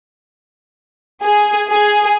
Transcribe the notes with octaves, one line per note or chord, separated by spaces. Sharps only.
G#4
G#4